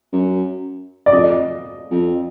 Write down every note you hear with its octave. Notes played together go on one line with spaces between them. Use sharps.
F#2
D5
F2 D#5
F2